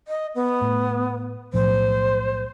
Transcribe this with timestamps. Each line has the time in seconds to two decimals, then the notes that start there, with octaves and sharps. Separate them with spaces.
0.08 D#5
0.35 B3
0.61 A2
1.53 B1 A2 F3 C5